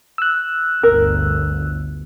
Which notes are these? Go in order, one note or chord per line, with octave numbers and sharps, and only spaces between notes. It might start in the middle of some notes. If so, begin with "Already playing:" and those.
E6 F#6
G1 D2 A#4